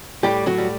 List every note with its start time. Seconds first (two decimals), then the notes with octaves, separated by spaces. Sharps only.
0.23 A2 G3 G4
0.46 F#3 F#4
0.58 G3